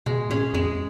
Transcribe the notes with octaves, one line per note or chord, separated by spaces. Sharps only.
B2 G#3
A#2 C#4 G#4
F2 G#3